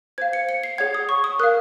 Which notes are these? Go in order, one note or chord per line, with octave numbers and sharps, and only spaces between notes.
C5 F5 G#6
C#7
C#7
C7
G#4 C#5 F#5 G#6
D#6
C#6
D#6
A#4 F5 F#6